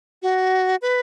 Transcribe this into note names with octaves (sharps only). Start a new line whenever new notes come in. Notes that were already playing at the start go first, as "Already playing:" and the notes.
F#4
B4